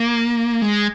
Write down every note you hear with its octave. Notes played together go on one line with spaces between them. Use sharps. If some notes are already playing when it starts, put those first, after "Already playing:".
Already playing: A#3
G#3